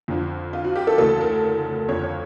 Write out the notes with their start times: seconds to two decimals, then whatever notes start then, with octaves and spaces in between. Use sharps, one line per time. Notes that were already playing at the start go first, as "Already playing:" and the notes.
0.08 F2 D3 F3
0.53 F4
0.64 F#4
0.76 G4
0.87 A4
0.98 D2 C#3 E3 A4
1.21 A#4
1.89 F2 D3 F3 C#5
2.03 C#5